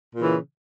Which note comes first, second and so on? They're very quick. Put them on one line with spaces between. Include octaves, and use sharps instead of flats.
A#2 C#3 E3